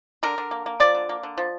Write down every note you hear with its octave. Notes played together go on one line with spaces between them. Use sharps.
D3 A#4
D3
A#3
A#3
F3 D5
D3
A#3
D3
F3